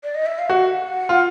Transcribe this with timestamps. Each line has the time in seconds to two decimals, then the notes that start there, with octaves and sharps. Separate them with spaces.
0.04 D5
0.15 D#5
0.26 E5
0.39 F5
0.50 F#4 F#5
1.09 F4